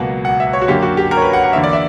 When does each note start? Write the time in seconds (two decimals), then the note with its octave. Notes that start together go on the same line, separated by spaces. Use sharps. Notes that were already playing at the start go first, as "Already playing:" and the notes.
Already playing: C#2 B2 F#3 A#3 F#5
0.25 F#5
0.40 E5
0.53 C#5
0.62 F#4
0.68 F#2 D3 A#3 G4
0.82 F#4
0.97 G4
1.11 A#4
1.17 C#5
1.22 B4
1.33 F#5
1.44 F#5
1.53 E2 D3 A#3 E5
1.64 D5
1.73 E5